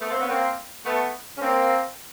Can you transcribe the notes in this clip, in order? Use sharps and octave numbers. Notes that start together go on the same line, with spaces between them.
A3 B3
A#3 C4
B3 C#4
A#3 C4
A3 B3
C#4
A#3 C4